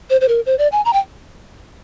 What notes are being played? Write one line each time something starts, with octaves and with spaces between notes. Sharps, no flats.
C5
C5
A#4
C5
D5
G#5
A#5
G5